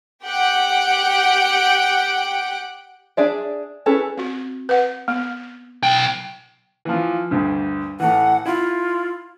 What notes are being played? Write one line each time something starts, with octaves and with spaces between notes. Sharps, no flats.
G4 F#5 G5 D7
D4 G#4 D5 E5
C#4 E4 G#4 A4 B4
C4 F#4
B4 F#5
B3
B1 G5
E3 F3
D2 G2
A2 E3 F#5
E4 F4